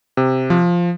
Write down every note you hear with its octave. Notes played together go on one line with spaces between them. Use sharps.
C3
F3